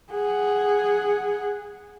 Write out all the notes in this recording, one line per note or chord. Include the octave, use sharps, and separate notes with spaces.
G#4 F#5